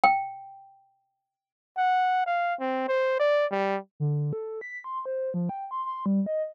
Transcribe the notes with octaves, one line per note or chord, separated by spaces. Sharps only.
G5
F#5
F5
C4
C5
D5
G3
D3
A4
B6
C6
C5
F3
G5
C6
C6
G3
D#5